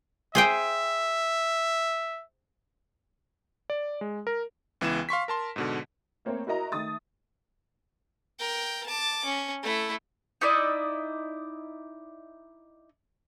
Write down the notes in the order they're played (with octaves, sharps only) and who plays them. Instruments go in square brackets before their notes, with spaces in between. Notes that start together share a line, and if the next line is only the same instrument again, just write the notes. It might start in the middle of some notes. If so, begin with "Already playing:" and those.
[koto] G#4 C5 G5 [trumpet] E5
[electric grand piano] D5
G#3
A#4
C#2 E3 B3 E4 E7
F5 C6 C#6 B6
A#4 A5 C6
G#2 B2 D3
[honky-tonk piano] A3 A#3 C4 C#5
E4 F#4 A#4 D#5 A#5
D#3 A3 D#6 A6
[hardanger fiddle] A#4 G5
A5 D6
C#4
A3 E4
[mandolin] D#4 E4 D5 D#5